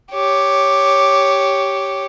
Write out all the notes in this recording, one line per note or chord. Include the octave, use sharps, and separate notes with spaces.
G4 C#5